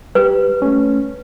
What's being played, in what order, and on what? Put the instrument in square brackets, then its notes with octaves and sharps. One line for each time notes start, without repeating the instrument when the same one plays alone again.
[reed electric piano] G3 G4 [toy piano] B4
[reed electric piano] A3 C#4